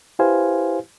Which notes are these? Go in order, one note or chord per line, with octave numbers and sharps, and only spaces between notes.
E4 G4 B4 C5 F5 G#5